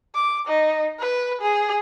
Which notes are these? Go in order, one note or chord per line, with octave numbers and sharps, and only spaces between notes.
D6
D#4
B4
G#4